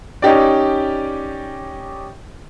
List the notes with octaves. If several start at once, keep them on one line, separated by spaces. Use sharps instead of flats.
C#4 D#4 G4 D5